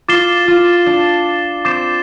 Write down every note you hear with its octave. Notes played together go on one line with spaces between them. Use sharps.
F4 D6 A6 C7 E7 G7
F4
D4
C4 D6 A6 C7 E7